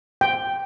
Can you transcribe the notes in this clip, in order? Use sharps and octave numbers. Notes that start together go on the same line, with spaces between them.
G5